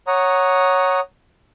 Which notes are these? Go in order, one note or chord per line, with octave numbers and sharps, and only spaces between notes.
C#5 F#5 A#5 D#6